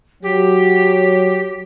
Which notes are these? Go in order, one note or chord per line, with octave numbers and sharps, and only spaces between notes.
F#3 G4